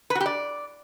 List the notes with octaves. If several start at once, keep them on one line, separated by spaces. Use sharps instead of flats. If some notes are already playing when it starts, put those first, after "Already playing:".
B4
F#4
G4
D5